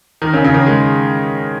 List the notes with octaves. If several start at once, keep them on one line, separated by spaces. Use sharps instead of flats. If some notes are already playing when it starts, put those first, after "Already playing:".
D#3
C#3
C#3
D#3
G#3